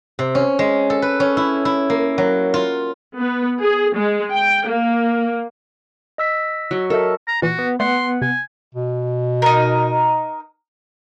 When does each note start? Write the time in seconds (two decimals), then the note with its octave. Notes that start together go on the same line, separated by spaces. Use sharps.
0.19 C3
0.35 C#4
0.59 G#3
0.90 A4
1.02 B4
1.20 C#4
1.37 E4
1.65 E4
1.90 A#3
2.18 F#3
2.54 F4
3.18 B3
3.61 G#4
3.95 G#3
4.35 G5
4.67 A#3
6.18 D#5 E6 B6
6.71 F#3
6.90 A4 A#4 D#5 E5
7.28 A#5
7.42 A#2 E3 F#4
7.59 B3
7.80 A3 B3 D5 F#5 C6
8.22 C3 G#5
8.75 B2
9.42 D#4 A#4